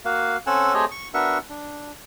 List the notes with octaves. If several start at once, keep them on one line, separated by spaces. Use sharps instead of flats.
A#3 F#4 F5
C4 C#4 A4 F#5 G#5 E6
A3 C4 G4 G#4 C#5 D#5
C#6
B3 D4 F#4 A#4 E5 C#6
D4